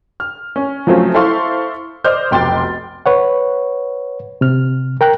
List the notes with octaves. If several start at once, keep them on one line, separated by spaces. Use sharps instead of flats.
F6
C#4
F3 F#3 A3 C4 C#4 F4
E4 A4 C5 F5 C6 C#6
C5 D5 D#5 D6 F6 G6
F1 B1 G5 C6 D6 A6
B4 C#5 F#5
C3 F6
A#4 G5 A#5 F#6